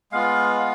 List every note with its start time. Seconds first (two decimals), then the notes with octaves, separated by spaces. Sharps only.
0.12 G#3 B3 F4 F5
0.59 F5